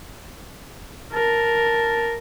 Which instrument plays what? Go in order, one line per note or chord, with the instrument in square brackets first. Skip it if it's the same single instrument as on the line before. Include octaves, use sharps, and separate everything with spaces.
[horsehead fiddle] A#4 [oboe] A5